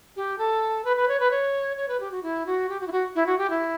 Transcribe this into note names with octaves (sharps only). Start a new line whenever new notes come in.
G4
A4
B4
B4
C#5
B4
C#5
C#5
B4
G4
F#4
E4
F#4
G4
F#4
E4
F#4
E4
F#4
G4
E4